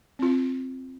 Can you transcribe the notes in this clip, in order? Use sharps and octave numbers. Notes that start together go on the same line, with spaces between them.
C4 F4